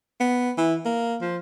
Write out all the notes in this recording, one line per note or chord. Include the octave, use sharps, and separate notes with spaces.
B3
E3
A#3
F3